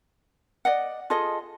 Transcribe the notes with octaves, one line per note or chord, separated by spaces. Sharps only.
D5 D#5 F#5
F4 G#4 A4 D#5